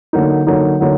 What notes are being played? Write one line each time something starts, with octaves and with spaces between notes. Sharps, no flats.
D3 F#3 A#3 D#4
D3 F#3 A#3 D#4
D3 F#3 A#3 D#4